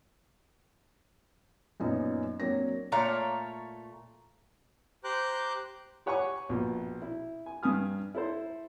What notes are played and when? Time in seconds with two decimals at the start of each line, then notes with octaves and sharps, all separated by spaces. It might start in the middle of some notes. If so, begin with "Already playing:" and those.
1.80 F#2 A#2 B3 C#4 D#4
2.40 F#3 A#3 C4 D4 C#5 A#6
2.92 A#2 A3 C#5 F5 A#5
5.04 G4 C5 A#5 D6 F#6 G6
6.06 G4 C#5 F#5 G#5 A#5 C#6
6.49 A#1 B2
7.02 E4
7.46 G#5
7.63 G2 G#5 D#6 F6
8.15 E4 A4 C5